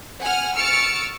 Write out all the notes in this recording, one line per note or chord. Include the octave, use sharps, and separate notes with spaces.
F#5 G#5 F6
C#6 E6 F6 A6 C#7 D7